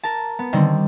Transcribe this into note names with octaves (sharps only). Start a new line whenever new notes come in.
A#4 A5
B3
D3 D#3 G3 C4